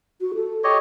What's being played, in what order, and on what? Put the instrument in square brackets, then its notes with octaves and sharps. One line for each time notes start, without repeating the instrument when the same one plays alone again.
[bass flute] F#4
A4
[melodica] G4 C#5 D#5